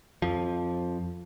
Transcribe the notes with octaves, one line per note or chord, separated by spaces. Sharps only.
F2 F3